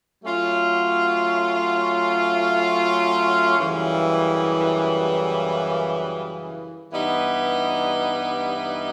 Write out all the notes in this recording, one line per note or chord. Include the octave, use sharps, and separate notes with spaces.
F#3 A3 C#4 F4
F#2 C#3 E3 G3
G2 E3 G3 B3 D#4